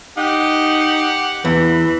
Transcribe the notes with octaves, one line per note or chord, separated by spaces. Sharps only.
D#4 G4 F#5
E2 E3